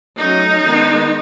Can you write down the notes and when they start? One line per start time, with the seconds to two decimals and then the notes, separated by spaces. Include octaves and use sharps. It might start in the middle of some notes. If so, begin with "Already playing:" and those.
0.18 F#3 A3 C#4 D#4
0.62 D#3 G#3 B3